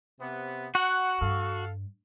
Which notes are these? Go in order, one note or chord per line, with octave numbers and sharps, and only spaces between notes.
C3 B3
F#4 F#5
G2 A4 F5